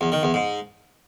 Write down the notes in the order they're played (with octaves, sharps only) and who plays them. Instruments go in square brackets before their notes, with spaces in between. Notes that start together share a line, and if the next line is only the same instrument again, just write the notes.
[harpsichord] E2
D#3
E2
G#2